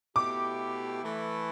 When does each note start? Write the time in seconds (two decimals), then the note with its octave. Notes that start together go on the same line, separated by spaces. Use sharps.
0.15 B2 A3 E4 G4 D6
1.03 E3 A3 E4